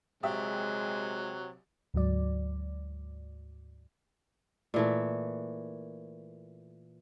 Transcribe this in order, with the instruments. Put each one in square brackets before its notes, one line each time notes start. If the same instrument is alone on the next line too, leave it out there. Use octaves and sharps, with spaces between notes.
[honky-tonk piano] A#1 G4 E5 [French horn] C3 [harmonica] F#3 [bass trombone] G#3
[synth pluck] D2 G#2 F#3 D5
[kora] A#2 E3 A3